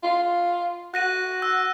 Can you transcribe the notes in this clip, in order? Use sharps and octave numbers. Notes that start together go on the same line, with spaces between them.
F4
F#4 F#6 A#6 D#7
E6 F#6